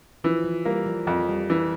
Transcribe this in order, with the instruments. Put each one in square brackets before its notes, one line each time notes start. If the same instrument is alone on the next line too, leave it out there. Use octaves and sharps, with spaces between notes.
[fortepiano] E3 [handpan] F3
[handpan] F3
[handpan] G3 [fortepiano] A#3
[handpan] F3
[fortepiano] F2 [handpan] F3
[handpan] G3
[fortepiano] E3